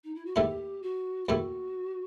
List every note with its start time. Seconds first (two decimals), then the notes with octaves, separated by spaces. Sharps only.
0.04 D#4
0.15 E4
0.25 F#4
0.36 D#2 D#3 A3 E4 G4
0.82 F#4
1.28 D#2 D#3 A3 E4 F#4